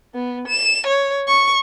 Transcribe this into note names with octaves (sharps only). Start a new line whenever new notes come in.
B3
E7
C#5
C#6